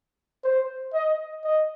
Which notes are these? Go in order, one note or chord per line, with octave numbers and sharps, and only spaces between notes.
C5
D#5
D#5